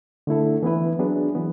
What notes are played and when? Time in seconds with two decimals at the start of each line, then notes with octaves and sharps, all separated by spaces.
0.27 D3 A3 E4 A4
0.63 E3 B3 E4 B4
0.99 F#3 B3 D4 G#4
1.35 E3 B3